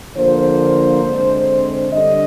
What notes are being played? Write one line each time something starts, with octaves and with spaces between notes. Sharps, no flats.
D3 F3 A#3 C5
D3 G#3 C4
D3 G3 D4 D#5